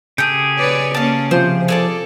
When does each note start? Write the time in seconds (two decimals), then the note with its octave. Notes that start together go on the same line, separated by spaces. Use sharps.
0.18 C#3 A3 G4 G#4 D#6 G6
0.58 B4 C#5 D5
0.95 A#3 C#4 F5 A5
1.31 C3 F3 C5
1.68 G#4 A4 D5 A5